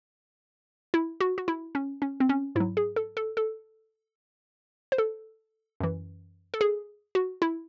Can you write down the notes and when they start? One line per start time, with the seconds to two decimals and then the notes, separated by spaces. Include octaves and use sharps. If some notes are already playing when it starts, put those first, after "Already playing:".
0.94 E4
1.20 F#4
1.38 F#4
1.48 E4
1.75 C#4
2.02 C#4
2.20 C4
2.29 C#4
2.55 G#2 F#3 E4
2.77 G#4
2.96 A4
3.17 A4
3.37 A4
4.92 C5
4.98 A4
5.80 F#2 E3
6.54 A4
6.61 G#4
7.15 F#4
7.42 E4